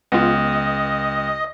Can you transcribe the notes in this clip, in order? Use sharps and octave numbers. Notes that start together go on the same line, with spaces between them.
C#2 B3 F4 D#5